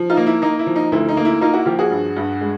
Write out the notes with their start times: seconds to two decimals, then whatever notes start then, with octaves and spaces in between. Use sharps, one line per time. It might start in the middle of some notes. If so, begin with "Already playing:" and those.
Already playing: F3
0.10 D#4 F4
0.17 A#3
0.27 E4
0.42 A#3 D#4
0.59 E4
0.67 F3
0.76 D#4
0.92 D2 E4
1.09 D#4
1.17 A#3
1.25 E4
1.41 A#3 D#4 F4
1.54 E4 F#4
1.66 F3 F4 G4
1.79 F#4 G#4
1.91 G2
2.16 G2
2.41 G#3